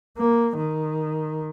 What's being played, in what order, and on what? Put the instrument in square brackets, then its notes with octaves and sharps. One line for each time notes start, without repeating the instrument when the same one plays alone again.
[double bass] A#3
D#3